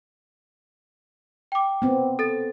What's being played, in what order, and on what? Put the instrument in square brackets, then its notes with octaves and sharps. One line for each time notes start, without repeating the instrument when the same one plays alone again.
[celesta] G5 D6
[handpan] B3 C4
[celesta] A4 A6